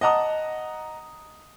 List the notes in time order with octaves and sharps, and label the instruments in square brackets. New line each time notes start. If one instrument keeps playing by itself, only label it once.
[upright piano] D#5 F#5 A5 A#5 D#6